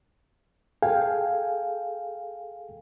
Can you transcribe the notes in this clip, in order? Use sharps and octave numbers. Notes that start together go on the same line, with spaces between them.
G#4 A4 F5 G5 G#5